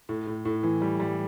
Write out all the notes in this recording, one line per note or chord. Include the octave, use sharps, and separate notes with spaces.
A2
A2
A2
E3
G3
G3